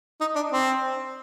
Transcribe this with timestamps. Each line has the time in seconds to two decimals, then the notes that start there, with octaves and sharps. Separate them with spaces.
0.21 D#4
0.36 D4
0.52 C4